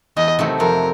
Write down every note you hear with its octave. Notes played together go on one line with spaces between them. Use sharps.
E2 D#5
C3 D#3 F#3 A3
F2 A#4